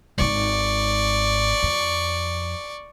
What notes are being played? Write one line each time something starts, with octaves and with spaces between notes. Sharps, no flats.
G#1 G#2 D5 C#6
F2